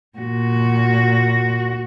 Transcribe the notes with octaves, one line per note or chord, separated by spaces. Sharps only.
A#2 F#4